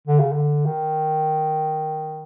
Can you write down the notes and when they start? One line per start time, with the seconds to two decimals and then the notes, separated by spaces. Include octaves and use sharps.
0.07 D3
0.20 C#3
0.32 D3
0.66 D#3